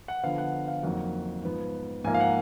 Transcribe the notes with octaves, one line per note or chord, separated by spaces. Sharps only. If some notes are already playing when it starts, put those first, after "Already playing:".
F#5
D3 F3 B3 F5
F#5
F5
F2 D#3 F#3 A#3 F#5
G#2 F3 B3
G#2 F3 A#3 G#5
F5
F#5